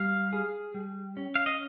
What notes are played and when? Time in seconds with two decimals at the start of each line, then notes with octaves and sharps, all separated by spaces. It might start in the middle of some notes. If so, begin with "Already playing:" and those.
Already playing: G3 F5
0.33 G#4
0.74 G3
1.17 C#4
1.35 F5
1.46 D#5